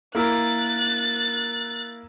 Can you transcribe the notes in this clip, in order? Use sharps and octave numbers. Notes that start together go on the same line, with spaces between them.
A#3 E4 A#4 F#6 A6